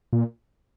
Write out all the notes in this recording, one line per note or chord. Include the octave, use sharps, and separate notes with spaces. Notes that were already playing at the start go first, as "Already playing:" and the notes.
A#2